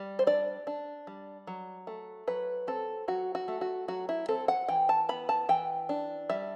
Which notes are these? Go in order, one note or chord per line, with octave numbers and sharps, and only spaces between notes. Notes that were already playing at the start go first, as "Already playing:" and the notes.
Already playing: G3
C5
D4 D5
D4
G3
F#3
A3
F#3 B4
C4 A4
F#3 F#4
F#4
A3
F#4
F#3 F#4
E4
C4 A4
F#5
E3 G5
A5
B3 B5
A5
E3 G5
D4
G3 E5